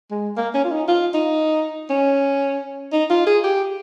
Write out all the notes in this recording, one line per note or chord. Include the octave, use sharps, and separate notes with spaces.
G#3
A#3
C#4
F4
D#4
F4
D#4
C#4
D#4
F4
G#4
G4